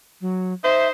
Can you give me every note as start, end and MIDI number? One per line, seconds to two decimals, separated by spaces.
0.21 0.53 54
0.64 0.90 63
0.64 0.90 72
0.64 0.88 76